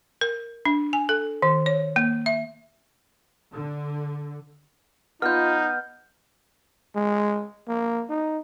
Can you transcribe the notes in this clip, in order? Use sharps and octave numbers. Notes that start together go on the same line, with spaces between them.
A#4
D4
G#5
A4
D#3
C#5
A#3
E5
D3
B3 D#4 F4 D#5 F6 G6
G#3
A#3
D#4